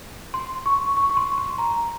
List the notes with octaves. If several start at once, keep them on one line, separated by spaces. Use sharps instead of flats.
C6
C#6
C#6
C#6
C6
C6
A#5